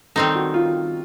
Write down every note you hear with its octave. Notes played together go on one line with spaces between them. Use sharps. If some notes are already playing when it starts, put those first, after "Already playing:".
D#3 G3 C4 D#4 A4
F#4
F4